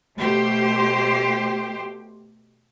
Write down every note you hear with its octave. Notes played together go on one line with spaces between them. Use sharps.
B2 A3 G4 C5